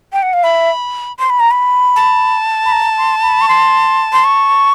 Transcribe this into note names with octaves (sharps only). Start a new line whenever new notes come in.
G5
F#5
F5
E5 B5
C6
B5
A#5
B5
A5
B5
A#5
C6
B5
C#6
C6
C6
C#6